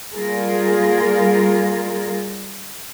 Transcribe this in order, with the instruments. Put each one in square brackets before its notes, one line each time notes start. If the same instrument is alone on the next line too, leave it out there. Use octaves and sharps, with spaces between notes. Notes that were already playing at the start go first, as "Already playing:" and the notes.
[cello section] G3 A#3 F4 G#4 A#4